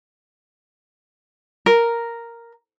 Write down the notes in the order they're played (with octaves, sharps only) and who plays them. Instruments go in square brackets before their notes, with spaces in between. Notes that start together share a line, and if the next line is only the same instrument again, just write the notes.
[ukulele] A#4